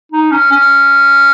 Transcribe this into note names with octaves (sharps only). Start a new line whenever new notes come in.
D#4
C#4
C#4